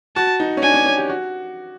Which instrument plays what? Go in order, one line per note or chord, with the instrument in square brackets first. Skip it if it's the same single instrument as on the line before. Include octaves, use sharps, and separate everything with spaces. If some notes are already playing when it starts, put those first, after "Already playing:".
[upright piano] F#4 [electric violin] A5
[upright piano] D#4
C#4
[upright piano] D4 [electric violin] G#5
[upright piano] C#4
C#4
G4
F#4